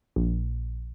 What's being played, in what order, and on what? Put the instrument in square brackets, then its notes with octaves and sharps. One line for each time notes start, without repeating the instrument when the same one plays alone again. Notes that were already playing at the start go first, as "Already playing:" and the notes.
[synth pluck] A#1